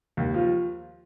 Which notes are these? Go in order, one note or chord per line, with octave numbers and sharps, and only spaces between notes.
D#2
F3